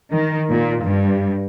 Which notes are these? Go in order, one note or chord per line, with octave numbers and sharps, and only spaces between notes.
D#3
A#2
G2